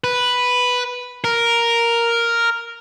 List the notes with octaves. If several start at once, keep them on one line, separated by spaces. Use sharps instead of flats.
B4
A#4